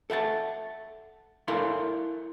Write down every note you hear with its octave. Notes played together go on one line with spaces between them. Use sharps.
A4 E5 F#5 A5
E4 A4 A#4 F5 G#5 C6